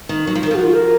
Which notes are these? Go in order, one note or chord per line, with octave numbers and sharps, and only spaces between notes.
D#3
F#3
F3
D#3
A#4
F3 F#4
F4
A#4